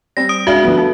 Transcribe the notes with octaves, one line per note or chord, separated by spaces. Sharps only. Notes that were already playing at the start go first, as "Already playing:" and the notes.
G3 C4 A#6
D#6 D7
C#2 D4 F#4 E5 F5
D3 F3 B3
B3 A4